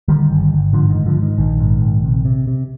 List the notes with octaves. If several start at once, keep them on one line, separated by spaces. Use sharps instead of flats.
D3 D#3 G3
G1
G1
G#2 D3 F3
D#3
G#2
D3 F3
G#2
D#3
A#1 D#3
G#2
A#1
C3
C3
C3